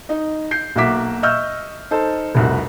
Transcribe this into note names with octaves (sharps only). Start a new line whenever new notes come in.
D#4 D#5
G6 C7
B1 A#3 F#4 E5 D6 B6
D#5 E5 C#6 E6 F6 G6
D#4 A4 C5
F1 C2 F#4